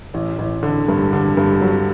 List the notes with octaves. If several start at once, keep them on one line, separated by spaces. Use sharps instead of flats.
A1
A1
D3
G2
D3
G2
F#3